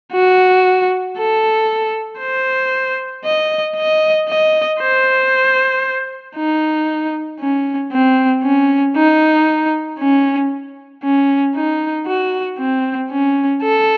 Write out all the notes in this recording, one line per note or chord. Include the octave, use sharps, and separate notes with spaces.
F#4
A4
C5
D#5
D#5
D#5
C5
D#4
C#4
C4
C#4
D#4
C#4
C#4
D#4
F#4
C4
C#4
A4